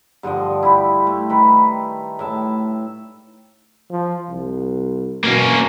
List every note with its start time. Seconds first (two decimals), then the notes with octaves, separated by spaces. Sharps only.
0.23 G2 D3 F3 D#5
0.63 E4 G4
1.07 A3
1.30 D#3 B4
2.19 A2 E5 A5
3.91 F3
4.29 C2
5.24 B2 A#3 C#4